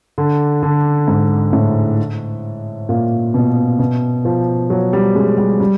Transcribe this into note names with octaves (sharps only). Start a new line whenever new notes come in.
D3
D3
G#2
A2
A#2
B2
B2
F3
F#3
G3
G#3
G3
G3